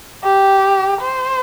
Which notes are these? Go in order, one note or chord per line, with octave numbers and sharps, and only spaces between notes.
G4
C5